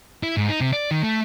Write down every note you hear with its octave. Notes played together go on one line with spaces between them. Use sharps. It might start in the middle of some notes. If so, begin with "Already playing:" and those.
E4
G#2
D#4
C3
D5
D#3
A3